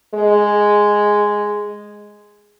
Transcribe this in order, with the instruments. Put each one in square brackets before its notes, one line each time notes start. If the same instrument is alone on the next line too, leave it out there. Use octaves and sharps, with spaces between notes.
[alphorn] G#3